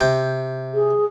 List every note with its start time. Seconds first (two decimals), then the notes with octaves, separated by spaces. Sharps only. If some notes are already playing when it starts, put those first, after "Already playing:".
0.01 C3 G5
0.74 G#4